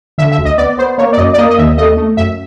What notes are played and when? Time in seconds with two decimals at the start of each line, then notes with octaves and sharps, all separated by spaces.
0.18 D3 E5
0.32 E5
0.38 D2
0.45 D#5
0.58 B3 D5
0.78 B3 C5
0.98 A#3 C#5
1.13 D5
1.17 F#2 D#5
1.33 D5
1.38 A#3 D#5
1.50 D#5
1.58 D#2 E5
1.78 A3 D#5
1.97 A3
2.17 F#2 E5